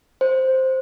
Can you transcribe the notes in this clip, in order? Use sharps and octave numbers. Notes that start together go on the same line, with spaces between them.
C5